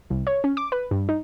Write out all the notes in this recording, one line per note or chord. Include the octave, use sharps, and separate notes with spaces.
C2
C#5
C#4
D6
B4
G2
D#4